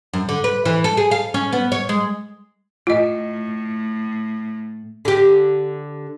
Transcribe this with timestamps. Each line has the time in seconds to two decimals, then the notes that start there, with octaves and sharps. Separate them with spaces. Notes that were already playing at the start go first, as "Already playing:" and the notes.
0.13 F#2
0.29 D3
0.44 B4
0.65 E3
0.84 A4
0.97 G#4
1.11 F5
1.34 C#4
1.53 B3
1.72 C#5
1.89 G#3
2.87 A2 F4 D#5
5.05 D3 G4